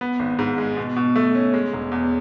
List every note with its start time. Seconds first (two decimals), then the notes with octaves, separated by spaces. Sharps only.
0.01 B3
0.19 G#1
0.39 G#2
0.58 G#3
0.77 B2
0.96 B2
1.16 A3
1.35 C#4
1.54 G#3
1.73 E1
1.92 E2